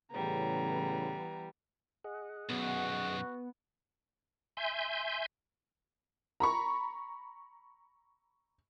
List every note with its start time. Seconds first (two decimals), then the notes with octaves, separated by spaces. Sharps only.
0.12 A2 C#3 E3 G3 B3 A#5
2.04 G#4 D#5 F#5
2.49 B1 F#2 B3 F#4
4.57 E5 G#5 C6 G6
6.40 A#5 B5 C#6